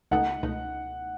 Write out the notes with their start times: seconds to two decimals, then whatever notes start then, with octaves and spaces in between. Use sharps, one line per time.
0.11 C#2 B2 A3 D#4 F#5
0.43 C#2 B2 A3 D#4